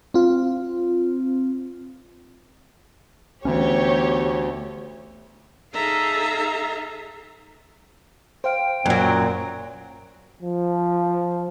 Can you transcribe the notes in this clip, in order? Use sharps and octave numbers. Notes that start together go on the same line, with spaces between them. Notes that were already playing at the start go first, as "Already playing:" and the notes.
C4 F4
D2 E3 B3 C#4 G4 C#5
D#4 G#4 A4 E5 F5 A#5
C5 F5 G5
F#2 A#2 F#3
F3